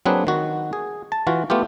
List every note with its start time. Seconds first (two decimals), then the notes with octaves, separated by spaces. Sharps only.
0.06 F#3 A#3 C4 D4 G#4 B4
0.27 D#3 F#4
0.73 G#4
1.12 A5
1.27 E3 F4 F#4
1.50 A3 B3 F4 G4